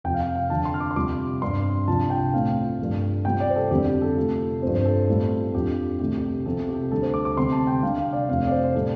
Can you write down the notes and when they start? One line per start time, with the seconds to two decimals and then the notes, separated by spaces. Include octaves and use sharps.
0.04 F2 C3 F3 G5
0.14 F5
0.20 G5
0.35 F5
0.50 F2 D3 F3 A5
0.65 C6
0.74 F6
0.80 D6
0.91 C6
0.96 F2 C3 G3 F4 D6
1.42 G2 G3 C4 C6
1.87 C2 C3 F3 D4 F4 A5
2.10 G5
2.33 A2 A3 C4 F4 F5
2.79 G2 F3 A3
3.25 C3 G3 C4 F4 G5
3.40 D5
3.50 C5
3.56 A4
3.71 F2 D3 G3 C4 G4
3.86 G4
4.02 A4
4.17 C3 A3 F4
4.62 G2 F3 C4 F4 C5
4.75 C5
4.85 A4
5.09 A2 G3 C4 F4
5.54 F2 F3 D4 F4 G4
6.00 C2 C3 A3 G4
6.18 G4
6.46 C3 F3 C4 F4 A4
6.69 G4
6.91 D2 D3 G3 A4
7.02 C5
7.14 D6
7.25 D6
7.37 D2 C3 G3 C4 C6
7.52 A5
7.67 G5
7.83 C3 G3 D4 F5
7.98 F5
8.13 D5
8.29 F2 C3 A3 C4 F5
8.47 D5
8.51 C5
8.63 C5
8.75 A2 G3 C4 A4